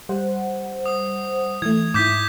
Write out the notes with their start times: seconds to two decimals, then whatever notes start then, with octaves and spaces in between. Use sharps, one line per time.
0.09 G3 C5 F#5
0.86 D#6
1.62 E3 A3 G#6
1.94 G#2 E4 D6 G6 B6